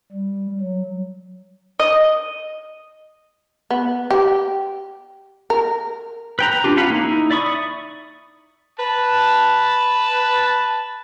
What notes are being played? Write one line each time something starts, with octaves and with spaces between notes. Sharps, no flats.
G3
F#3
D#5
B3
G4
A#4
B4 G5 A#5
D4 F4 G4
C#4 F4 F5 F#5 B5
A#3 D#4
D#4 E4
D5 E5 B5 C#6 D#6
B4 A5